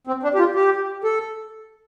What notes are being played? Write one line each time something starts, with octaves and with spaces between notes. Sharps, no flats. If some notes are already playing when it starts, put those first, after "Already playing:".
C4
D4
G4
F4
G4
A4